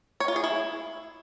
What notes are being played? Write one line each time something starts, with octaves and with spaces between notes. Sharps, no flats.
C#5
F4
G#4
E4